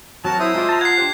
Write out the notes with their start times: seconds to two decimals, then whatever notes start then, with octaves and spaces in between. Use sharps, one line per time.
0.25 F#3 C4 F#4 A#4 A5
0.40 E4 C5 E5 D#6
0.55 G#3 F4 D5
0.69 A5 A#5
0.81 F#5 G#6 C7
0.98 D4 G4 C5